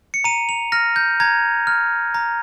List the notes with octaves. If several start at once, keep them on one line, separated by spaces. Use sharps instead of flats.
C#7
A#5 D#7
F7
F6 A#6
G6
A#5 G#6
F6
A#5